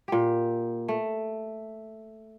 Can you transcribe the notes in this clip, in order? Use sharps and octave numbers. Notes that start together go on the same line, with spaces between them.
A#2 G4
A3